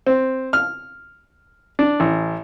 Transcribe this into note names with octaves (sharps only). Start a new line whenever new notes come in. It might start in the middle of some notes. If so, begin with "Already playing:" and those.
C4
F6
D4
A1